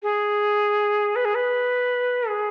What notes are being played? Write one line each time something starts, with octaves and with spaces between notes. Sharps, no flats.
G#4
B4
G#4
B4
G#4